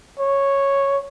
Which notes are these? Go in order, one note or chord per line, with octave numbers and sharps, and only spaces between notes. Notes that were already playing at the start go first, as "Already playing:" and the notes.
C#5